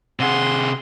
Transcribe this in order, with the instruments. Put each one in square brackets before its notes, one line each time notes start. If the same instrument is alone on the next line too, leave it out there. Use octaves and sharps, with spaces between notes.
[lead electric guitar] C3 G#4 [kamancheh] F#5 C6